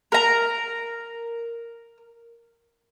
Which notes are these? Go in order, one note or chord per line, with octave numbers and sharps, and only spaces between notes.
A#4 A#5